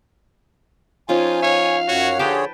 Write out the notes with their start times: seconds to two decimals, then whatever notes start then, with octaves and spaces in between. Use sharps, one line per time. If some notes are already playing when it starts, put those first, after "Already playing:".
1.09 F3 C#4 D#4 F4 G#5
1.43 C#5 F5
1.88 F#2 F#4 C#5 F#5
2.19 D3 G4 G#4 B4 C#5 G5 A5